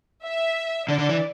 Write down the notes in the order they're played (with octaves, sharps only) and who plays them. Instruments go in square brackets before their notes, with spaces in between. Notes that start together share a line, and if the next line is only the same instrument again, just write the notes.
[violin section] E5
[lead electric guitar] D3 [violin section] D5
[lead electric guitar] D3
E3